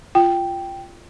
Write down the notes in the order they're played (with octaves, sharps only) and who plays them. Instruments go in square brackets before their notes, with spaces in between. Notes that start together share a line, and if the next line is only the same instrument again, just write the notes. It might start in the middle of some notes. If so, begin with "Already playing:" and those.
[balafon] F4 [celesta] G5